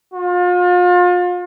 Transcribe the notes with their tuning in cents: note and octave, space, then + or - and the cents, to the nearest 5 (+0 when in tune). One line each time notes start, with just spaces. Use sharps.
F4 +35